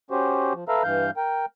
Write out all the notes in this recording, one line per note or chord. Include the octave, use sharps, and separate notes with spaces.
C#4 F#4 G4 C5
F3
A4 B4 E5 F5 A#5
G2 E3 F5 G6
A#4 G5